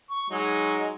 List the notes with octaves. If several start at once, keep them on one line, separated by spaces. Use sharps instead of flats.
C#6
F#3 G#3 D#4